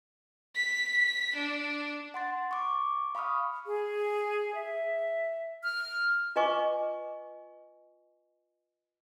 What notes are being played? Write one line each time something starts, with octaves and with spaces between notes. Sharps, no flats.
B6
D4
F#5 C6 A6
C#6 D6
F5 B5 C#6 D#6 F6
G#4
E5
F6
F4 B4 D#5 G#5 C#6 D6